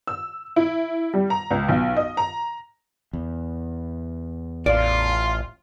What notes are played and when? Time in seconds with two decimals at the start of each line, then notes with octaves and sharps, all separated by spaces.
0.07 E6
0.56 E4
1.14 G3
1.30 A#5
1.51 C#2
1.68 B1
1.97 D#5
2.17 A#5
3.13 E2
4.66 A1 F4 D5